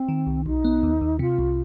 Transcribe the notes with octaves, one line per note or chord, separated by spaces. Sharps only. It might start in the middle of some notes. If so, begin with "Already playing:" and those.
Already playing: C4
D#3
C2
B1 D#4
B3
D#2
D#2
C3 F4
C2